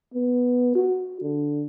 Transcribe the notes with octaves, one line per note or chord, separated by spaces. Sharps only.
B3
F#4
D3